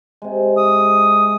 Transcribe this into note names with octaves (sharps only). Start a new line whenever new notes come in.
C3 G#3
D#6